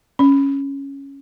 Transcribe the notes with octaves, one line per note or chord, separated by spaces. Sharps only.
C#4